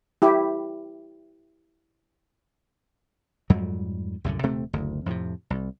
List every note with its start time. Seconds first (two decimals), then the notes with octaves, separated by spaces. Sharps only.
0.22 E4 G4
3.50 F2 G#2 F#3 G3
4.24 C2 F#2 A2 D3
4.43 D#1 C3 A3 C4
4.73 F#1 D2
5.06 F2 A2 C3
5.50 C2